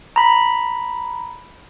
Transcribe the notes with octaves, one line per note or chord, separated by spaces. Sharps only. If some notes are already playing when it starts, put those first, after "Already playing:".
A#5 B5